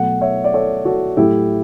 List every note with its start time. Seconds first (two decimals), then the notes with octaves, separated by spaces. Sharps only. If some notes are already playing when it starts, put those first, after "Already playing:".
Already playing: B2 F#3 A3 F#5
0.21 C#5 E5
0.44 D5
0.54 A4 C#5
0.85 F#4 A4
1.17 A2 F#3 A3 E4 G4